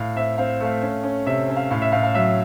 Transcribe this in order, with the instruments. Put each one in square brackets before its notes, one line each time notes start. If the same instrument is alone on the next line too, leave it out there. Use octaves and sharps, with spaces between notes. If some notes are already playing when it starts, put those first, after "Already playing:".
Already playing: [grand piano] A2 F5
C4 E5
C4 F5
A3 F5
C#4
C#4
C3 E5
C#4
F5
A2 F5
E5
A2 F5
F5
F#3 E5